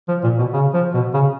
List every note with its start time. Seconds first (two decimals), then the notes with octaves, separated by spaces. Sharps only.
0.08 F3
0.23 A#2
0.39 B2
0.53 C#3
0.74 F3
0.94 B2
1.14 C#3